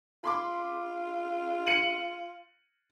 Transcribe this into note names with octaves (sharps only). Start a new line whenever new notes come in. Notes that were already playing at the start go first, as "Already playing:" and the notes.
F4 B5 C6 D6
C#7 D#7 F#7